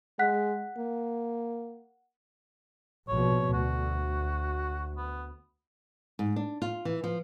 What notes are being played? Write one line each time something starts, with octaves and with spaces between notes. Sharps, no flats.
G#3 F#5 F#6 B6
A#3
A#1 B2 C#5
D2 F#4
B3
G#2
D4
F4
E3
F3